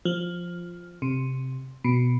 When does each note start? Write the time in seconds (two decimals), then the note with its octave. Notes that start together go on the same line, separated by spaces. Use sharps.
0.05 F3
1.02 C3
1.84 B2